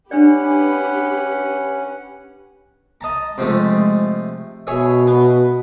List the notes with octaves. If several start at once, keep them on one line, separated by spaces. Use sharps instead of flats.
C#4 D4 G4 B4 D5 F#5 B5
D#5 A5 A#5
C3 F3 G#3 A3
B2 G#4 C#5 E5
B3